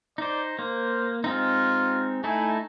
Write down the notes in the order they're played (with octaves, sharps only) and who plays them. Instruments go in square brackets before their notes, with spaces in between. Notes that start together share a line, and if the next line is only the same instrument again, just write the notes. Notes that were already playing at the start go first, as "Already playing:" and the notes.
[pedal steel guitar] D#4 C5 [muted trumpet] D5
[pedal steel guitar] A#3 [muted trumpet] C5
[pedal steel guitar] G#3 C4 D#4 [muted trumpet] F4
[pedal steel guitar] A3 D#4 E4 [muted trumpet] G#5